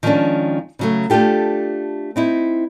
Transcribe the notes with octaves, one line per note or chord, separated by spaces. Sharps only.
D#3 F3 G#3 A3 C#4 D4
C#3 F#3 A3
A3 D4 F4 G4 A4
C4 D#4 E4